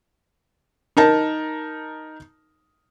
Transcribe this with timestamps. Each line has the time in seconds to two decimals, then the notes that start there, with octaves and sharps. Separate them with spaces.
0.97 D#4 A#4 A5